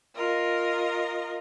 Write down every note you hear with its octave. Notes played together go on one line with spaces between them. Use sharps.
F4 A#4 D#5